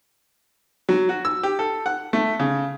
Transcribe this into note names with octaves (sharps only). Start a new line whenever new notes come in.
F#3
F#4
E6
G4
A4
F#5
A3
C#3